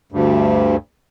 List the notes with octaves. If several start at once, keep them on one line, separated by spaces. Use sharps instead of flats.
D2 G2